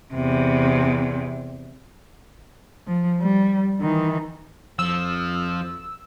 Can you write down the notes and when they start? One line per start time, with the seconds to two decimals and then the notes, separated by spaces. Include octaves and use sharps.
0.14 E2 C3
2.87 F3
3.21 G3
3.81 D#3 E3
4.79 F2 F3 E6